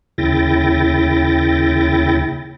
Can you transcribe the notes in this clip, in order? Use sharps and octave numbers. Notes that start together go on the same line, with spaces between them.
D#2 C#3 E4 G5 A6 A#6